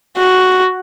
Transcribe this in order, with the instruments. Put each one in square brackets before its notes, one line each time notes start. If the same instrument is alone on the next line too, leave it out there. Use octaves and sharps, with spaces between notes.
[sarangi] F#4